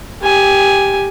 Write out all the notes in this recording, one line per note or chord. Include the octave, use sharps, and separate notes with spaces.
G4 G#5